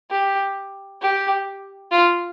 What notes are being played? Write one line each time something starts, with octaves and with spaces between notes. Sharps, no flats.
G4
G4
F4